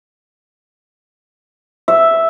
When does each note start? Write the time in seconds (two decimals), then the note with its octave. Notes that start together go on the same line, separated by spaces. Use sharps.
1.88 E5